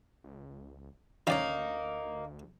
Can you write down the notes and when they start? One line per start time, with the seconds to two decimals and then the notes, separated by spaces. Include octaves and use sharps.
0.24 C#2
1.27 D2 D#3 A#3 C#4 D#4 D5 F5